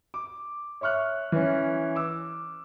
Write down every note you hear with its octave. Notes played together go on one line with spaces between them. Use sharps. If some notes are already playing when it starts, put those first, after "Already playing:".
D6
C#5 E5 C#6 F6 F#6
E3 C#4
D6 E6